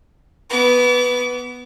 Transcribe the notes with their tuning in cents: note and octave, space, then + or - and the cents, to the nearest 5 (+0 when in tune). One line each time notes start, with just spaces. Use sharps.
B3 +0 D6 -40